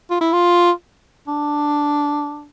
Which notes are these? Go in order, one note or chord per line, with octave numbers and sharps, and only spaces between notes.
F4
E4
F4
D4